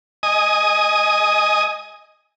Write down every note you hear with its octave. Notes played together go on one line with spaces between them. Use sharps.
D#5 G#5 D#6